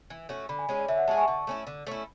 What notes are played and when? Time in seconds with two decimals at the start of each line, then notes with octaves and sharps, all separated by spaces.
0.10 E3
0.29 A3 C#4 F#4
0.49 D3 B5
0.59 G#5
0.69 G#3 C#4 G#4 C#5
0.79 D5
0.88 D3 E5
0.98 F#5
1.08 G#3 C#4 G#4 A5
1.18 C#6
1.28 D3
1.47 A3 C#4 E4
1.67 D3
1.87 A3 C#4 E4